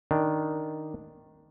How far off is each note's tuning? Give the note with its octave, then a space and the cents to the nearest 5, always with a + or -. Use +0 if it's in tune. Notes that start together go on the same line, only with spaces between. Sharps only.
D#3 +0 D4 +0